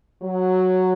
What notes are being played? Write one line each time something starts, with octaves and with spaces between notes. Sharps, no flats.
F#3